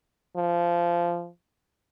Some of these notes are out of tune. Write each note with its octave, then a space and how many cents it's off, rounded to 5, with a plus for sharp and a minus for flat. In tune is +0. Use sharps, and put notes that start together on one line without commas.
F3 -15